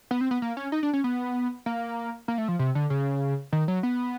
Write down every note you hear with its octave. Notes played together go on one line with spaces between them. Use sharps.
B3
C4
B3
A#3
C#4
D#4
D4
C#4
B3
A#3
A#3
A3
F3
C3
D3
C#3
D#3
F#3
B3